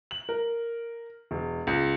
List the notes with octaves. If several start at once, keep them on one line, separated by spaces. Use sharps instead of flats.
F#7
A#4
E1
C#2